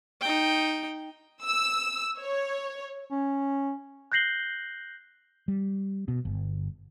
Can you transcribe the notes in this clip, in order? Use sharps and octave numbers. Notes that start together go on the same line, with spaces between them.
D#4 G5
E6
C#5
C#4
F#6 G6 A#6 C7 F#7 G7
G3
B2
G1